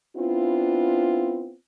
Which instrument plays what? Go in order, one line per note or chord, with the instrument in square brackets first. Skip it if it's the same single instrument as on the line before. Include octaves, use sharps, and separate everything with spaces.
[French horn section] B3 C4 D4 E4 F4